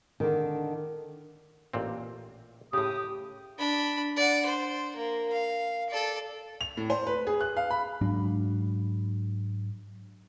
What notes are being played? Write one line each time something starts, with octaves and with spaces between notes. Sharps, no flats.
D3 D#3
A1 A#2 C4
A2 C#3 G4 D#6
D4 B5
D5 F#5
C5
A#3
F5
A4 D5
F7
A2
C5
B4
G#4
F#6
F5
B5
G#2 F#3 D4